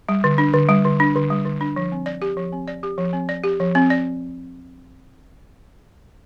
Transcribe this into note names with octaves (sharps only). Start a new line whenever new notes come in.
G3
D3
D4
D3
G3
D3
D4
D3
G3
D3
D4
F3
C4
D5
G4
F3
C4
D5
G4
F3
C4
D5
G4
F3
C4
D5